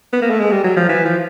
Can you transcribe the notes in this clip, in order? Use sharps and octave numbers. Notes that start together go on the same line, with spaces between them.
B3
A#3
A3
G#3
G3
F#3
F3
E3
F3